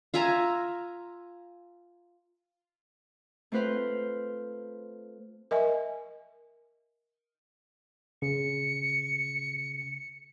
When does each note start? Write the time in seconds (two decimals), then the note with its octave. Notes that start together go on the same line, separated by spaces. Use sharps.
0.14 F4 E5 G#5 A#5
3.52 A3 C4 F4 B4 C5 F5
5.51 A#4 D#5 E5 G#5
8.22 C#3 C#7